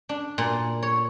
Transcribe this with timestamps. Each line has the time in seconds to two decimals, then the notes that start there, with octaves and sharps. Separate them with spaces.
0.09 D4
0.38 A#2
0.83 C#5